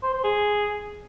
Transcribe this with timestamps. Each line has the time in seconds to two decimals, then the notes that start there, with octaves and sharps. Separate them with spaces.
0.03 C5
0.13 C5
0.24 G#4